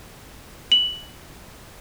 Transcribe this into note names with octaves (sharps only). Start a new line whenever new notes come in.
F#7